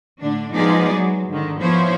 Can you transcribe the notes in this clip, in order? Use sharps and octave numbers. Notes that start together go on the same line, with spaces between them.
A2 D3 D4
F3 G#3 B3 D#4 G#4 D5
F#3 G#3
G#2 D3 D#3
F3 B3 E4 C5 C#5